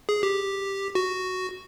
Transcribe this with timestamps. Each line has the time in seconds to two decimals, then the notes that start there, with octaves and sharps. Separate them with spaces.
0.09 G#4
0.23 G4
0.95 F#4